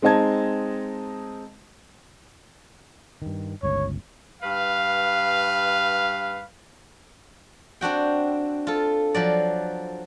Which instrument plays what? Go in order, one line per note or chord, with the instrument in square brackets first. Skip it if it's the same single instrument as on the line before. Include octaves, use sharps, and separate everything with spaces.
[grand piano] G#3 C4 D#4 D#5 A5 G#6
[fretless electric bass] G2 D#3
[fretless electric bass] G1 C#2 [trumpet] C#5
[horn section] G2 B4 F5
[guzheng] C4 D4 F#4 G5
F4 A4
F3 F#3 D5